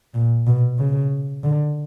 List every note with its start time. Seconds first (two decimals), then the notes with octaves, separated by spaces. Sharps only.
0.14 A#2
0.47 B2
0.79 C#3
1.44 D3